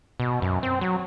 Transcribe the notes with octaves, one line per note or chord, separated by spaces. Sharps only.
B2
F#2
C4
F#3